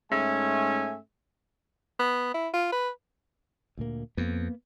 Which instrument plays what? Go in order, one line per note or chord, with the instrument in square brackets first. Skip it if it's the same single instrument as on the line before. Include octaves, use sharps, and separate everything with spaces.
[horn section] G#2 A3 C#4 E5 G#5
[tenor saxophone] B3
E4
F4
B4
[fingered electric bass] D2 A#2 A#3
[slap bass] F2 [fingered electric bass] A#3 B3